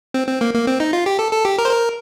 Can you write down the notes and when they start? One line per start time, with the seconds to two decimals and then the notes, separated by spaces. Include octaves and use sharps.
0.14 C4
0.28 C4
0.41 A#3
0.54 A#3
0.67 C4
0.80 D#4
0.93 F4
1.06 G4
1.19 A4
1.33 A4
1.45 G4
1.59 A#4
1.65 C5
1.71 A#4